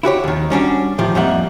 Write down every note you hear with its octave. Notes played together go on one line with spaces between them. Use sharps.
E4 F#4 G4 C#5
D#2 D#3
G3 C#4 D4 F#4
A2 D#3 F3 G4
F2 G3 A#3 E5 F#5